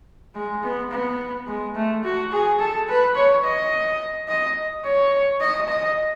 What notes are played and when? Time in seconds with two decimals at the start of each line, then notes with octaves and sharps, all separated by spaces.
0.35 G#3
0.63 B3
0.91 B3
1.47 G#3
1.75 A3
2.04 F#4
2.32 G#4
2.60 A4
2.88 B4
3.15 C#5
3.44 D#5
4.28 D#5
4.84 C#5
5.41 D#5
5.68 D#5